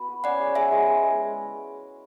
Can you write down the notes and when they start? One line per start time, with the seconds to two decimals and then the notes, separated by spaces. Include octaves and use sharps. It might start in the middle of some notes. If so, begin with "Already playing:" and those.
Already playing: B3 F#4
0.08 B4
0.24 C#4 D5 F#5
0.40 G#3
0.55 G#4 E5 G#5
0.72 G#3
0.87 G#3
1.04 G#3